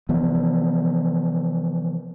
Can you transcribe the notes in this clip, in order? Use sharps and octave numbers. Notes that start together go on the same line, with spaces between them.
C3 E3 F3 B3